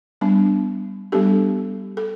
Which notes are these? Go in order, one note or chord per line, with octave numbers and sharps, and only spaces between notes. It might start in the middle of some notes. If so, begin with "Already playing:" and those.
G3 B3 D4
G3 B3 D4 G4 A4
A4